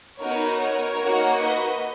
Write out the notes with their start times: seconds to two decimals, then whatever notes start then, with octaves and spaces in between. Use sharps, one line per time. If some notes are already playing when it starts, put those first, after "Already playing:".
0.21 B3 D#4 F#4 A#4 C#5
0.60 A#4 C#5
1.00 A#3 D#4 F#4
1.39 B4 D#5